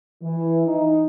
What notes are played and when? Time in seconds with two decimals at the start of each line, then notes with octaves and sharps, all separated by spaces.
0.23 E3
0.67 D#4